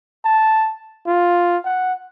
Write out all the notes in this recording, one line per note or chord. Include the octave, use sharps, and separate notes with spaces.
A5
F4
F#5